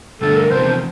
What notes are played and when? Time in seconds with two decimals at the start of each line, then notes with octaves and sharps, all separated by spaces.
0.21 G2 D3 A3 A4
0.36 A#4
0.50 E2 C3 F3 C5